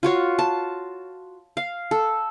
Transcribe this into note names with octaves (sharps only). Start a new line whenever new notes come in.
F4 F#4 C#5
A5
F5
A4